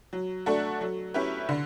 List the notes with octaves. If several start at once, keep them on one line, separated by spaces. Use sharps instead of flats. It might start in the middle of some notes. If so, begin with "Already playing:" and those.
F#3
A3 D4 F#4 A4
F#3
C#4 E4 G4 B4
D3